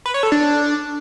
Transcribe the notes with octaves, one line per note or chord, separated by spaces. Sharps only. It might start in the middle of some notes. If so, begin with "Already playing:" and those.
B4
C#5
A4
D4